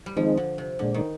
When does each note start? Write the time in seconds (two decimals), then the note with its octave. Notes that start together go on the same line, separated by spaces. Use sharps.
0.06 G3
0.16 D#3 F3 G#3 C4 D#4
0.37 D3
0.58 C3
0.79 A#2 D3 G#3 D4
0.94 D#3